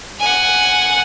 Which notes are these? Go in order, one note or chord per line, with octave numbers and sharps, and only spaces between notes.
F#5 G#5